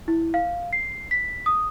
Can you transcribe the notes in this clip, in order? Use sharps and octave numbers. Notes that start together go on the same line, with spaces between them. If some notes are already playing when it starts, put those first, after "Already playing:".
E4
F5
C7
B6
D#6